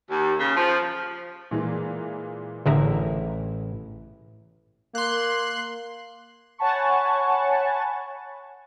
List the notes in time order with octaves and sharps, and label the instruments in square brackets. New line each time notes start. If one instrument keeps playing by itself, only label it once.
[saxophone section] D#2
C#3
F3
[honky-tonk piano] A#2 E3 G#3
[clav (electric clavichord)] A1 E4 E5 [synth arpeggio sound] D3 G#4 A#4
[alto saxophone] A#3 [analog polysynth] C6 F#6
[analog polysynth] C#5 F#5 G#5 A5 B5 C#6